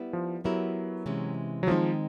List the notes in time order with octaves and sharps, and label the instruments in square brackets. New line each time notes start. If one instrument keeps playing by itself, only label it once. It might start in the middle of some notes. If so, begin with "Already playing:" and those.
Already playing: [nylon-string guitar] G3 B3 E4
[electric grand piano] F3
[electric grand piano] F#3 [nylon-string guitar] B3 E4 G4 A#4
[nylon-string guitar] C3 E3 G#3 C#4
[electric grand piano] F#3
[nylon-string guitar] D#3 G#3 C4 D#4 [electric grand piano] F3